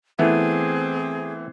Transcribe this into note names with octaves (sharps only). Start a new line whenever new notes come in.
E3 A3 B3 C4 E4 G#4